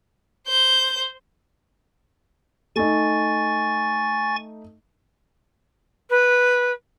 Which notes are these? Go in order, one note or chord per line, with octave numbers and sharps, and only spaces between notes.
C5 G6
A3 D#4 G#5 C#6 A6
B4